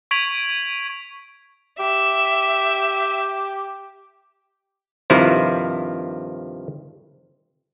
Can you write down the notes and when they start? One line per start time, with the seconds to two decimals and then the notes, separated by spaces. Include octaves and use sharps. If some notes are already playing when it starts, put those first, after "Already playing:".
0.11 C#6 G#6 B6 D7 F7 F#7
1.79 G4 E5
5.10 G2 C3 D#3 F3 E4